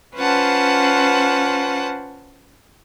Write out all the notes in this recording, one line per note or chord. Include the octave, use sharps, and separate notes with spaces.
C#4 F4 B4 C5 F#5 A5